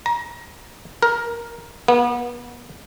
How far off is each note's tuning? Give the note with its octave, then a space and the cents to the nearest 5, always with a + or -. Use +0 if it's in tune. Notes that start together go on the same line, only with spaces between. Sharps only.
A#5 +25
A#4 +10
B3 -35